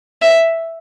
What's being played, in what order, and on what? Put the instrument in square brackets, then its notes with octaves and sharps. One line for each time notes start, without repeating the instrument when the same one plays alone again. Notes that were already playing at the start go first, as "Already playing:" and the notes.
[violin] E5